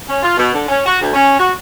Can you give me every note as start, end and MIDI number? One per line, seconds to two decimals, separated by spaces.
0.08 0.21 61
0.22 0.34 65
0.37 0.50 47
0.54 0.65 50
0.67 0.84 61
0.86 0.98 66
1.01 1.12 38
1.13 1.35 61
1.38 1.52 66